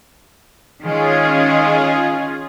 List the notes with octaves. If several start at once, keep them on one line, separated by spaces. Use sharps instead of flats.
D#3 G#3 C#4 F4 G#4